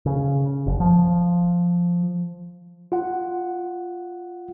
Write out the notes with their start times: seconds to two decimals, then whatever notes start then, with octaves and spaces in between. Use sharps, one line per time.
0.06 C#3
0.66 F#1
0.80 F3
2.92 F4 F#5